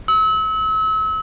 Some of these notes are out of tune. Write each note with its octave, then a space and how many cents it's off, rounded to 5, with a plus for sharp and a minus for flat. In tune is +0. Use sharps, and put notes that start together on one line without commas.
E6 -35